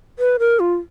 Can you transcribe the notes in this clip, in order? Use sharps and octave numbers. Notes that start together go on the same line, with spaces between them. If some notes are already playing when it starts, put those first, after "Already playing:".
B4
A#4
F4